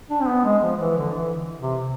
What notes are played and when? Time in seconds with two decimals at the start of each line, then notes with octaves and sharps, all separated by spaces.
0.10 D4
0.20 C4
0.27 B3
0.44 G#3
0.62 F3
0.80 E3
0.97 D3
1.15 E3
1.60 C3